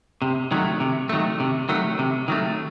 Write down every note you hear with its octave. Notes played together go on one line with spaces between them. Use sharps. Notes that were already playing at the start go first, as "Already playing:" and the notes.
C3
D#3 F#3 A3
C3
D#3 F#3 A3
C3
D#3 F#3 A3
C3
D#3 F#3 A3